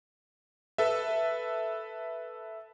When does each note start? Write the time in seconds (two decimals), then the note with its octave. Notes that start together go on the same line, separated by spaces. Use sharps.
0.78 A4 B4 E5